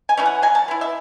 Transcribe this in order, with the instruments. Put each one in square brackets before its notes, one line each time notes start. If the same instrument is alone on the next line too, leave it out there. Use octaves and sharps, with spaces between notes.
[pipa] G#5
E3 A3 C#4
F#5
F#3 G#5
A5
B3 E4
E5